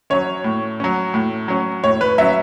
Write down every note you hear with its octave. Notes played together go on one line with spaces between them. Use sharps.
F#3 C#4 C#5
A2
F#3 C#4
A2
F#3 C#4
A2 C#5
B4
F#3 C#4 E5